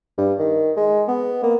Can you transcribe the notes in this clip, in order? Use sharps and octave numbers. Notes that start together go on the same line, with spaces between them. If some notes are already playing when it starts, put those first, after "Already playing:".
G2
D#3
G#3
B3
A#3